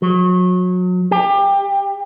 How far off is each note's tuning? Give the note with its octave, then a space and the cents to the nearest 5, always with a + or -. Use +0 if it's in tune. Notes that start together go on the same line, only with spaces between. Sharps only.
F#3 -30
G4 +25